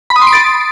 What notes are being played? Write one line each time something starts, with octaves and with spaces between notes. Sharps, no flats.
B5
D#6
C6
D7
A6